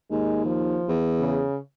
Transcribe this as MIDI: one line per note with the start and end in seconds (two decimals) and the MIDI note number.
0.11 0.79 39
0.11 0.40 56
0.45 0.91 53
0.88 1.43 40
1.20 1.57 49